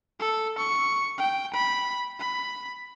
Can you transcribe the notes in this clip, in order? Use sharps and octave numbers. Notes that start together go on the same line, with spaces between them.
A4
C#6
G5
B5
B5